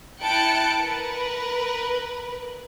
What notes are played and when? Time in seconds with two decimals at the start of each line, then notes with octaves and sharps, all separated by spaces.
0.22 E4 G5 A5 F#6 C#7 D7
0.78 A#4 B4